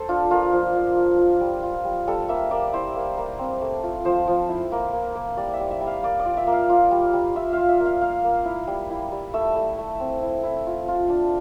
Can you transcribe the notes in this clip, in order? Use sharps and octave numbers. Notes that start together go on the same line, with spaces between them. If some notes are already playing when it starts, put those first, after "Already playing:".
Already playing: A4 C5
D4 F4
A#3 F4
F3
F3
F4
F4
G3
F4
G3
G3 A4
A#3 E5
A#3 D5
E4 C5
A#3
A#3
C4
A3
F4
F3 C5
F3
E4
A#3
A#3
A#3
G3 D5
E5
G3
E5
G3
F5
A#3 D5
D5
F4
E5
A#3
F5
F4
G3
G3
F4 E5
F4 F5
E5
A#3
F5
A#3 F5
A#3
E4
G3
E4
G3
A3 E5
A3
A3
C4
E4
E4
F4
F4
D4